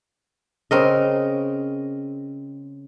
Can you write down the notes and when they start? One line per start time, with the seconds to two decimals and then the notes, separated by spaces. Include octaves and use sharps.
0.71 C#3 C4 A#4 D#5